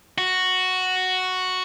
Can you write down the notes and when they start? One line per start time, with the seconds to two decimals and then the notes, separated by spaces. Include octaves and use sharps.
0.18 F#4